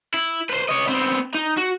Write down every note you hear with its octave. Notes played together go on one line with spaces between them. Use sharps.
E4
B4 C5
C#5 D#5
B3 C4
D#4
F#4